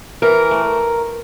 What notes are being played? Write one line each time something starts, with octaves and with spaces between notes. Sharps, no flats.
E3 A#4
A3